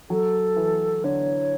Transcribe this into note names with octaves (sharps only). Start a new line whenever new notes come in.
F#3 A4
E3
D3 C#5